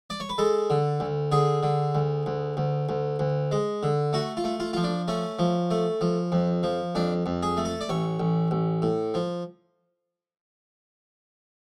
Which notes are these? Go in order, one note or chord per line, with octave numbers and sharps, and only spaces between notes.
D5
C#5
B4
G#3 A4
D3
D2
D3 G#4
D3
D2
D2
D2
D2
D2
G#3
D3
A3 F#4
F4
A3
F4
F3 F4
D4
A3 C#4
F3
A3
F3
F2
F3
F2 D4
F2
G#4
A3
A4
D5
A1 C#5
A1
A1
A2
F3